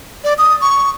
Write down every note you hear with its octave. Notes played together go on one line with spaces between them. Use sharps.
D5
D#6
C#6